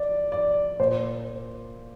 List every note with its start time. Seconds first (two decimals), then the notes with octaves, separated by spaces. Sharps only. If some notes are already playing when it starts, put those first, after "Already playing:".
Already playing: D5
0.32 D5
0.79 A#2 C5